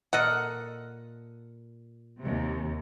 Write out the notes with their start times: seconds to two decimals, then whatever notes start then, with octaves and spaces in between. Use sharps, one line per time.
0.13 A#2 A4 A#4 D#5 F#5
2.19 D#2 C3